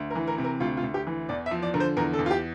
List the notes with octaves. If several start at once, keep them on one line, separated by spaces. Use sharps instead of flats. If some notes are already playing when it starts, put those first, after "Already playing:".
Already playing: D2
A#4
E3
A#4
C3
A#4
D2 F4
F4
D2
G4
E3
E2 D5
E5
F3
D5
D3 A#4
C5
E2 A#4
A4
E2
F4
G4